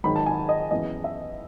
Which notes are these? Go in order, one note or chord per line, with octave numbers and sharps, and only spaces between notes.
G#2 D#3 F#3 B5
A5
G#5
D#5
F#2 E3 G#3 B3 D#5
E5